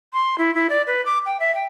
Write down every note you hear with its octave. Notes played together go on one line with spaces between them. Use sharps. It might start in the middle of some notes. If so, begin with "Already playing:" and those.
C6
E4
E4
D5
B4
D6
G5
E5
G5